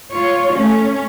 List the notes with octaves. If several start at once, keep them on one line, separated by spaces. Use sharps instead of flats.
F4 C#5
A3 C#4